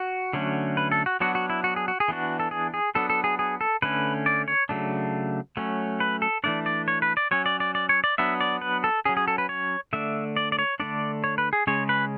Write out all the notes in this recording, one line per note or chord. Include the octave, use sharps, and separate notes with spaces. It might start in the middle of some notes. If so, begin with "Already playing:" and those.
Already playing: F#4
D3 F#3 A3 C#4
B4
A4
F#4
F#3 B3 D4 F#4
F#4
E4
F#4
G#4
F#4
G#4
E3 B3 D4 F#4
A4
G#4
G#4
F#3 B3 D4 A4
A4
G#4
G#4
A4
D3 A3 C#4 B4
D5
C#5
C#3 F#3 A3 D4
F#3 A3 C#4
B4
A4
E3 A3 D4 D5
D5
C#5
B4
D5
F#3 C#4 C#5
D5
D5
D5
C#5
D5
F#3 B3 D4 E5
D5
B4
A4
F#3 C#4 G#4
G#4
A4
B4
C#5
D3 A3 D4 E5
D5
D5
C#5
D3 A3 D4 D5
C#5
B4
G#4
C#3 G#3 C#4 C#5
B4